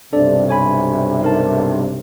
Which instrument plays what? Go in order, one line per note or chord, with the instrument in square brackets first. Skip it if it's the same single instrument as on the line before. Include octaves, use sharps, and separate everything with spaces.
[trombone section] B1 G2 C3 [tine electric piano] D4 A4 D5
[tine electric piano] C#5 G#5 B5
D#4 A#4 A5